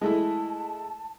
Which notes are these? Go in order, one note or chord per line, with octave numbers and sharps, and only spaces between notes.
G#3 A3 E4 A5